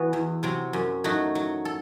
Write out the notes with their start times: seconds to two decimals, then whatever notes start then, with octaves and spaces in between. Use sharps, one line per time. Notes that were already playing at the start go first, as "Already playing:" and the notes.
Already playing: E3 B3 F#4
0.13 E2
0.43 C3 F#3 C4
0.73 F#2
1.04 F#3 A3 D#4 F#4
1.35 F#3
1.65 A4